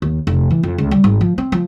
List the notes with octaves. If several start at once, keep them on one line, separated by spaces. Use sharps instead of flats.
D#2
F1
E3
F2
C#2
G3
G#1
F3
C4
F3